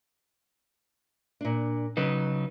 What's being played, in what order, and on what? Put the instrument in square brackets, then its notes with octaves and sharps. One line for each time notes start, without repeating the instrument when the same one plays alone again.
[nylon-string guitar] A#2 D4
[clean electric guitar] C#3 F#3 D#4 [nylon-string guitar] B4